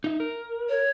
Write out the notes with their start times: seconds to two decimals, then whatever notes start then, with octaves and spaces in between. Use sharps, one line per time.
0.04 D#4 E5
0.20 A#4
0.69 C#5